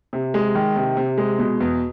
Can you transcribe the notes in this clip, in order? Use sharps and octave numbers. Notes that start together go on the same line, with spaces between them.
C3
G#3
D#3
C3
C3
G#3
B2
E2